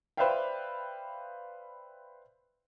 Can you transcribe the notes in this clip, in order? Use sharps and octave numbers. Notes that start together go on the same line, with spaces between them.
B4 C5 D5 E5 F5 G5